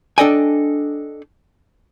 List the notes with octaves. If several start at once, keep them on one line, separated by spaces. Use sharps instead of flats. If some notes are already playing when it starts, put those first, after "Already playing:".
D4 A4 D5 D#5 G5 G#5